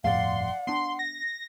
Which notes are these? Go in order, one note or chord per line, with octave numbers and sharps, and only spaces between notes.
G1 F2 A2 D5 F5 F#5 C6
B3 D4 C6
A#6